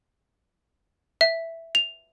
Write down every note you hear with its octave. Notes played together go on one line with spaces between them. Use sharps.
E5
F7